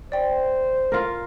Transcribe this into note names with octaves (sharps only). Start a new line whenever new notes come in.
C5 D5 G5
F4 A#4